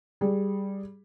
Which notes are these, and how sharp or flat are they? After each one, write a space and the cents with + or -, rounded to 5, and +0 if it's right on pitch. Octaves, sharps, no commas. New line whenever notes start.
G3 +0 G#4 +0